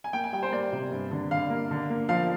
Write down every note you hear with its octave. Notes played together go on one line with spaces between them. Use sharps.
G#5
A#3 G5
G#5
G3 G5
C5
A#3 D5
C3
G2
D3
D3 F5
A#3
D3
A#3
F3 F5